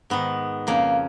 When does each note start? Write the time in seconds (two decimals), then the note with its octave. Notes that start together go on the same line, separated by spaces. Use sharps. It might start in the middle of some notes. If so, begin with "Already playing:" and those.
0.10 G#2 D#3 B3
0.67 F2 C#3 A#3